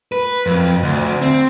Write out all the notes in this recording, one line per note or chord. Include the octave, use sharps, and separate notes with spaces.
B4
F2
D2
C4